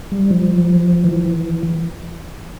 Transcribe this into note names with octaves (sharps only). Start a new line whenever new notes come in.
G3
F3
E3